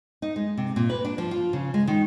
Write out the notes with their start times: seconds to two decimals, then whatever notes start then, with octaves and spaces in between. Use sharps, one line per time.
0.22 D#4
0.36 G#3
0.57 C3
0.76 A#2
0.90 B4
1.05 D4
1.18 F3
1.31 F4
1.53 C#3
1.74 G#3
1.87 D#3